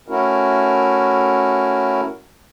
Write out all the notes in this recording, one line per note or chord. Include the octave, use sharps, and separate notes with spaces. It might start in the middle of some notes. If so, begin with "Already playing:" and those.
A3 C#4 E4 F#4 A#4